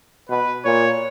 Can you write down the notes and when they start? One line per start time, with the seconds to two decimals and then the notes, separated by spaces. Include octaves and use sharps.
0.29 B2 B4
0.65 A#2 C#5